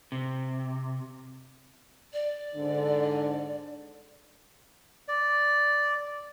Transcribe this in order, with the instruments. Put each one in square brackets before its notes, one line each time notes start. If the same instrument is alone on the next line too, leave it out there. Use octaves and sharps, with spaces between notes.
[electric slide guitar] C3
[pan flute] D5
[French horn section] G#2 D3
[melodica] D5